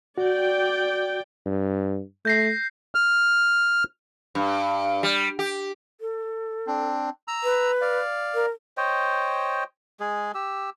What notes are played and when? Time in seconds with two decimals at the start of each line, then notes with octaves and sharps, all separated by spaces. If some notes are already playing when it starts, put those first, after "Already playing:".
0.18 F#4 D5 G5
1.46 G2
2.25 A3 G6 A#6 C7
2.95 F6
4.35 G2
5.03 G3
5.39 G4
6.01 A4
6.67 C4 D4
7.28 A#5 E6
7.44 B4
7.81 D5 F5
8.34 A#4
8.77 C5 C#5 D#5 G5
10.00 G#3 G#4
10.35 G4 E6